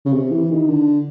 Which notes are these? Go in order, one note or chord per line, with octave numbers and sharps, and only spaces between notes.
C#3
C3
E3
D#3
D3